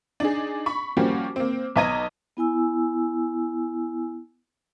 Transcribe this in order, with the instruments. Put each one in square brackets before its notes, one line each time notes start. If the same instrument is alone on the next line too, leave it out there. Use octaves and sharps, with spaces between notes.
[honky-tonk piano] D4 D#4 G#4
B5 C#6
F3 G3 A#3 C#4 F#4 G4
A#3 C4
B1 B3 D#5 A#5 G#6 D#7
[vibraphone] B3 E4 G#5 E6